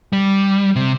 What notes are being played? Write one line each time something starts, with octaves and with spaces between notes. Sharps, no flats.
G3
C3